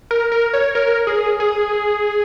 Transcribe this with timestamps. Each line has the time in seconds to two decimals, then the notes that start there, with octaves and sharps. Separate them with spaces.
0.11 A#4
0.32 A#4
0.53 C#5
0.75 A#4
1.07 G#4
1.40 G#4